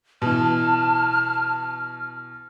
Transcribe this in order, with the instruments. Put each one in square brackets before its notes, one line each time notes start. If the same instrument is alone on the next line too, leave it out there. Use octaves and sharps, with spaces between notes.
[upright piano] B2 E3 [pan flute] A5 [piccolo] F6